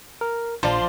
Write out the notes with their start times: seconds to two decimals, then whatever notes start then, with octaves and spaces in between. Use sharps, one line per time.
0.21 A#4
0.63 A#1 F3 D5 A5 C6